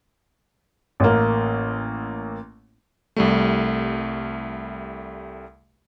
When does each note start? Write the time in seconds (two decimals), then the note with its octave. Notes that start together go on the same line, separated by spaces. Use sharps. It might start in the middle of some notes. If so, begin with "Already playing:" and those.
1.00 A1 A#3
3.16 C2 G3 A3